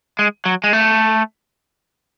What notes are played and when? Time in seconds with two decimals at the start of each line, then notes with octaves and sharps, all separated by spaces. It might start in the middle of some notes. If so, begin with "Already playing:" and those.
0.19 G#3
0.45 F#3
0.64 G#3
0.73 A3